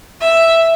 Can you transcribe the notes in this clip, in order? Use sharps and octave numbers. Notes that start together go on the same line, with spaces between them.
E5